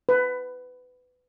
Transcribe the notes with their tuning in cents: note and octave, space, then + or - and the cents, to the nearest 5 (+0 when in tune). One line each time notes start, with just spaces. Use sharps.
B4 +20